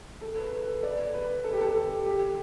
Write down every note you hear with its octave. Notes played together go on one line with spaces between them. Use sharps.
A4
B4
B4
A4
D5
B4
A4
G4
A4
G4